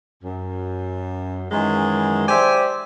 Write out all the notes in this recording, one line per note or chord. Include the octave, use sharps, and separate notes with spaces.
F#2
F#2 D#3 E3 G#3
G4 C5 D5 E5 G#5